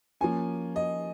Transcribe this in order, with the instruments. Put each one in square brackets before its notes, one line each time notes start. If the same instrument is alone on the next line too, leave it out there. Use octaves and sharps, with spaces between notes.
[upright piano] F3 A#3 C#4 G#5
D#5